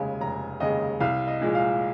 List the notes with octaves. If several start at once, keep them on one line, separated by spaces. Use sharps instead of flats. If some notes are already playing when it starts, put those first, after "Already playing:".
Already playing: F1 D#2 C#3 G#3 G#5
F1 A#5
D#2 C#3 G#3 D#5
C2 F5
D#5
A#2 F3 G#3
F5